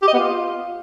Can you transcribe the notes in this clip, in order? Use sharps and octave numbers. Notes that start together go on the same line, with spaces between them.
G4
D#5
B3
F4